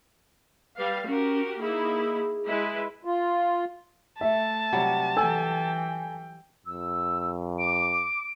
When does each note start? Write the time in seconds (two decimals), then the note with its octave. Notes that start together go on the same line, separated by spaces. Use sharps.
0.78 G3 B4 F5
1.07 C#4 F#4 G4 A#4
1.61 A#3 D#4 E4 G#4
2.47 G#3 E4 B4
3.05 F4
4.21 A3 E5 A5
4.73 C3 F#3 G3
5.16 E3 A4 G5 G#5 E6
6.66 F2 E6
7.59 D6 D7